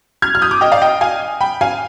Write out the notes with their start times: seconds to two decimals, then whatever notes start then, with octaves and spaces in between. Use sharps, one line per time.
0.22 F6 G#6
0.35 F6
0.42 D#6 G6
0.51 D6 F6
0.61 D#5 G5
0.72 D5 F5
0.82 D#5 G5
1.01 F5 G#5
1.41 G5 B5
1.61 F5 G#5